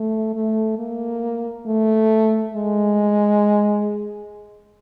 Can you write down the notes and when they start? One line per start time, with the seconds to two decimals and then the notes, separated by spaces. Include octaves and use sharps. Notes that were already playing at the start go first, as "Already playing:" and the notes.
Already playing: A3
0.34 A3
0.78 A#3
1.66 A3
2.54 G#3